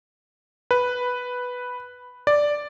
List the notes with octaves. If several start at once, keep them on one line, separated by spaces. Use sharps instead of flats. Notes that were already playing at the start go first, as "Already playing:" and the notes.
B4
D5